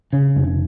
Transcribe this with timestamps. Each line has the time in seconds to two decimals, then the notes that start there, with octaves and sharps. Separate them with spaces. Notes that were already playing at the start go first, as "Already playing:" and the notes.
0.13 C#3
0.36 F1